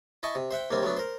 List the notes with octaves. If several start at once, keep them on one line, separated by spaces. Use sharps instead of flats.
E4 D#5 G#5 A5 C#6
C3
C5 E5 F#5 G5
D#2 C3 G3 A#3 C4
F#3 A3 B3 D4
A#4 C5